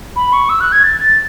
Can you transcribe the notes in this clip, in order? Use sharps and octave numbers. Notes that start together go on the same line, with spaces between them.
B5
C#6
E6
F#6
G#6
A6
A6